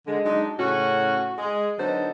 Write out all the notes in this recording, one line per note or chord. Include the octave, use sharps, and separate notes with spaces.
D3 G#3
F#3 G#3 D4 D#4
A2 C#3 C#4 F#4
G#3 G#4
D3 F#3 B3 D#4 A4 C5